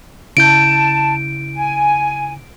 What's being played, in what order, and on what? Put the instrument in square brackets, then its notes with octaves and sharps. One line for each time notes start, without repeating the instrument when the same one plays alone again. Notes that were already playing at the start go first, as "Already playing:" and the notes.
[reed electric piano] C#3 E4 G6 [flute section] A5 [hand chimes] D7
[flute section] G#5